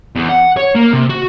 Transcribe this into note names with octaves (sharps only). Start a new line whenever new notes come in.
E2
F#5
C#5
A#3
C3
F#4